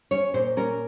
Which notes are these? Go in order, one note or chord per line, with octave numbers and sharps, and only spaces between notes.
C#4 C#5
A#2 C5
C#4 A#4